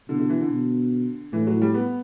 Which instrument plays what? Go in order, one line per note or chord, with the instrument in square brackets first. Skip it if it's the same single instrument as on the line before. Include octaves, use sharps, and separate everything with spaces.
[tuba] B2 [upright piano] D3
[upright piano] D3
E3
D3
[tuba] B2
[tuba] A2 [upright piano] E3
[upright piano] F#3
G3
B3